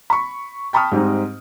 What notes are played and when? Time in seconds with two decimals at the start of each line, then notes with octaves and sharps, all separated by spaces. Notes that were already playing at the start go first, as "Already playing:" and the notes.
0.10 B5 C#6
0.73 G5 A5 B5 C#6 D#6 F6
0.92 G#2 G3 C4 D#4